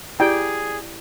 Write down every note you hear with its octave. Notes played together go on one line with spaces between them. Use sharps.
E4 G4 G#4 D5 G5